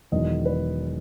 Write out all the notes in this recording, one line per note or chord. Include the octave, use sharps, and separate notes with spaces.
E1 E2 D#3 F#3 D#5
B4